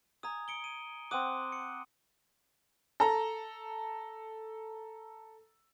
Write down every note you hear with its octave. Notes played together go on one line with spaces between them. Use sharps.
G#5 A#5 D#6
C#7 D7 G7
D#7
C4 F#5 D6 D#6 D#7
C#7
A4 A#5